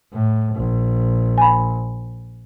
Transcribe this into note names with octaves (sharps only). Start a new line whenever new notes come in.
A2
A#1
G#5 B5